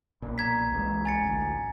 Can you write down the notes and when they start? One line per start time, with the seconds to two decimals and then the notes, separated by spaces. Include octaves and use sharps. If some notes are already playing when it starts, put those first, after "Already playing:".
0.22 B1 A#2
0.38 A#5 G#6 B6
0.72 C2 E3 G#3
1.05 G#5 A6 C#7
1.22 A1 D2